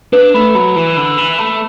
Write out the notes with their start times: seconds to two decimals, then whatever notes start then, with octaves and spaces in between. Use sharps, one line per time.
0.13 D4 B4
0.34 A3 B5
0.55 F#3 B5
0.76 E3 B4
0.96 D3 B5
1.18 E3 B5
1.38 A3 B5